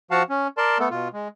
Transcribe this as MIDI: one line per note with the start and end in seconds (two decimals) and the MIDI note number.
0.11 0.23 53
0.11 0.23 66
0.11 0.23 77
0.11 0.23 78
0.11 0.23 81
0.30 0.48 61
0.58 0.78 70
0.58 0.78 74
0.58 0.78 81
0.58 0.78 84
0.79 0.88 57
0.79 0.88 59
0.79 0.88 69
0.91 1.08 47
0.91 1.08 65
1.13 1.28 56